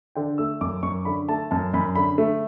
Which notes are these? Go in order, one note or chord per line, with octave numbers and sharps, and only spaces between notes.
D3 G5
A3 E6
F#2 D6
F#2 C#6
D3 B5
A3 A5
F#2 A5
F#2 B5
D3 B5
A3